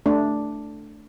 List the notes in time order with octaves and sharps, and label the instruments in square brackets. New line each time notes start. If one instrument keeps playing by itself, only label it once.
[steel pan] A3 D4